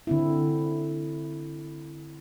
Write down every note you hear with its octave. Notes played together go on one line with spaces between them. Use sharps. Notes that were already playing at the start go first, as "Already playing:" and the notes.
D3 C4 E4